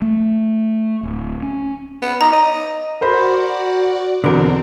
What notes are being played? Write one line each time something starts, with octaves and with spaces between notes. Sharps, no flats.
A3
D1
C#4
B3
D#4 A#5
D#5
F#4 A#4 C5 D5 F#5 B5
E2 B2 D3 C4 A#4